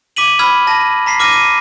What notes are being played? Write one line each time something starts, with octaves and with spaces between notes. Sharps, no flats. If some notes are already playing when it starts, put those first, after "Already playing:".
D6 B6 D#7 F#7
B5 E6 F6 G#6
A5 A#6
A#5 B6 C7
D6 F6 A#6 D#7
D#7